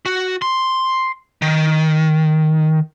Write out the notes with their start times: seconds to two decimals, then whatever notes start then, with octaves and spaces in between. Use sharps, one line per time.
0.06 F#4
0.42 C6
1.42 D#3